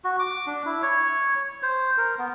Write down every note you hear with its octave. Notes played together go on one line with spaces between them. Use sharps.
F#4
D6
D4
E4
C#5
C5
A#4
B3